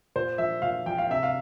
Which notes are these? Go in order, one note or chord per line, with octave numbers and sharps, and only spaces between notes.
A#2 C5
F3 E5
A#2 F5
F3 G5
F5
C3 E5
F5